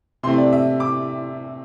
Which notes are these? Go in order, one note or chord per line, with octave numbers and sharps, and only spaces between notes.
C3 E3 A3 C4 C6
D5
E5
D6